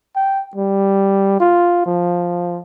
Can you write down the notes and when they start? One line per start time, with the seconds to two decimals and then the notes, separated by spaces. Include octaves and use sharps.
0.16 G5
0.56 G3
1.40 F4
1.86 F3